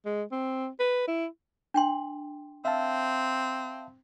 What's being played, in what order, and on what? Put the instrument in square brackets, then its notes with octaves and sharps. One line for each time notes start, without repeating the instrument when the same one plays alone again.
[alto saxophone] G#3
C4
B4
E4
[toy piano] D4 G5 C6
[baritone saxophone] C4 [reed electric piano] E5 F5 A5